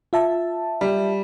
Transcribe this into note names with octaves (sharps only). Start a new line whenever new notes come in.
F4 E5 A5
G3